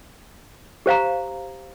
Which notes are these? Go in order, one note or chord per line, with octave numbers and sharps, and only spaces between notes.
G4 C5 F5 A#5